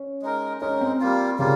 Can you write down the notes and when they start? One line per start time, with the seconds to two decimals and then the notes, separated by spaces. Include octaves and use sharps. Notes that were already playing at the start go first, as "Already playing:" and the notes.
Already playing: C#4
0.22 G#3 D#4 A#4
0.61 G#3 C#4 D#4 A#4
0.81 C4
1.00 G3 A#3 F4
1.39 C#3 G3 A#3 F4